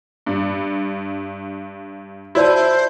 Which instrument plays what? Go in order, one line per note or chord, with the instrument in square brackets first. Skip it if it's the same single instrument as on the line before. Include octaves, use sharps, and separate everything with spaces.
[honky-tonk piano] G2
[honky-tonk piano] E4 [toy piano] F#4 D5 A5 [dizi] C5